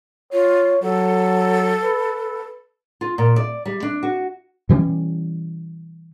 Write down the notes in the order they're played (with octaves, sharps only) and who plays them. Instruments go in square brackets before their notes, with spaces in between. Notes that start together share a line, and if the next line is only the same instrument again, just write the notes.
[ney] F4 [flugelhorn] C#5
[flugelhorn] F#3 [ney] A4
[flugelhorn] B4
[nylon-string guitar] F4
A#2
D5
G3
D4
F#4
[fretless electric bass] B2 E3 G3 C#4